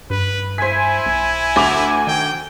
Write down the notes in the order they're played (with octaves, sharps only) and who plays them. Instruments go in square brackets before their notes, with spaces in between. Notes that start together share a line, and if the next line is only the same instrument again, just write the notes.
[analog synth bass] G2 [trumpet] B4
[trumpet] E4 [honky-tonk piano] C5 B6 [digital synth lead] G#5
[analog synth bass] B1
[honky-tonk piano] D2 D6 F7
[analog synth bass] D#3 [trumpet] G5